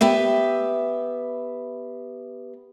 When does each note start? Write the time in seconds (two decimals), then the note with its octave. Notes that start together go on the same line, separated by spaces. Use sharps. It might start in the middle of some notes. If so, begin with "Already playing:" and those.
0.01 B3 G4 B4 E5